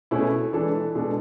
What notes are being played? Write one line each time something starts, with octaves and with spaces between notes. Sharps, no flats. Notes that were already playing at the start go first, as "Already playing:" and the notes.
B2 A3 C#4 E4 G#4
E3 G#3 D4 A4
B2 G#3 D4 A4